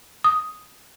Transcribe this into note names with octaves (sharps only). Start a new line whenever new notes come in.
D#6